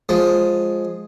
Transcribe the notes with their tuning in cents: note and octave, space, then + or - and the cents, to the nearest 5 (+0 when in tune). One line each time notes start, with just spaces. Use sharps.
F3 +10 G#3 +0